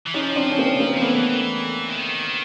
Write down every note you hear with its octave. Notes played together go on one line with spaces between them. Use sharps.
E3
F3 C#4 D#4
C4 D4
C#4
A#3 C4
A#3 C4
F3
E3 A3 B3
D#3